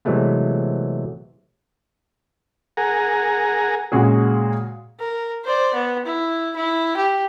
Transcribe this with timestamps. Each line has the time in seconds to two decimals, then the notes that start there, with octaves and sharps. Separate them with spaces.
0.05 C3 E3 F#3 G#3 A3 B3
2.77 G#4 A#4 F#5 G#5 A#5
3.92 A#2 C#3 G#3 F#4 G#4
4.99 A#4
5.45 C5 D5
5.74 B3
6.06 E4
6.56 E4
6.97 G4